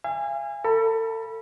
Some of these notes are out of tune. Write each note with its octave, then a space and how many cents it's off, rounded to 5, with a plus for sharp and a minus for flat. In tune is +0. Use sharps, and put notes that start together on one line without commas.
F5 -40 G#5 -25
A4 +35 B5 -25